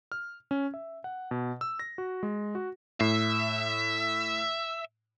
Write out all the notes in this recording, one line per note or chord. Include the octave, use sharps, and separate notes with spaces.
F6
C#4
E5
F#5
B2
E6
A#6
F#4
G#3
F#4
A2 E5 C7